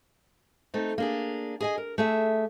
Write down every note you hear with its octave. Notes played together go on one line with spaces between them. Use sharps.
A3 C4 D#4
A#3 D4 G#4
G#4 D#5 G#5
A#4
A3 G#4 E5